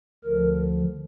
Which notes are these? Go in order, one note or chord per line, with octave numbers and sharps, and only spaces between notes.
D2 D3 F3 A#4